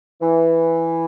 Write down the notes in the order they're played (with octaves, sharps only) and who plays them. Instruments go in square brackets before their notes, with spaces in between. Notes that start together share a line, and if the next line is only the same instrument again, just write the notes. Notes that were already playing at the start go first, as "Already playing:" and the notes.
[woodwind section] E3